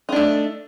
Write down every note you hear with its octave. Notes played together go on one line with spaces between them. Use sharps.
A3 D4 D#4